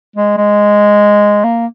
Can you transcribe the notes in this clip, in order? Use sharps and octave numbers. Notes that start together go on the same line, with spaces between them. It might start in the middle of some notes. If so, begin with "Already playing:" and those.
G#3
G#3
A#3